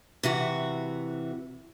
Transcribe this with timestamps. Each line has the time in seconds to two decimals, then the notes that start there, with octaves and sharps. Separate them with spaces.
0.23 C3 E3 F#4